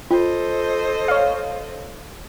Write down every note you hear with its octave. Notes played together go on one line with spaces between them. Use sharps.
F4 A4 C5 D#5
C#5 F5